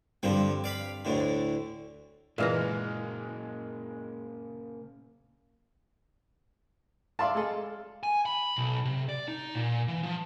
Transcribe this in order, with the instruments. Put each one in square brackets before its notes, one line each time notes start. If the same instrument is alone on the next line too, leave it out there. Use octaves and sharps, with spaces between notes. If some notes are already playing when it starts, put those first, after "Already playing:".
[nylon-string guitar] G2 C4 [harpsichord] D3 F3 G3
[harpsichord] D5 F5 B5
D2 A2 D3
[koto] A#2 E3 A#5 [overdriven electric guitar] C#3 A#3 [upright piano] G#3 F5 F6
[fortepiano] D5 E5 A5 [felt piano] F5 C6
[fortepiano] G#3 G#4 A4
[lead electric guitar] G#5
B5
B1
C3
D5
D#4
A#2
E3
F3